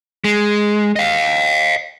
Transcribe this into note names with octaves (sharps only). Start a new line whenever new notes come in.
G#3
D#5 F5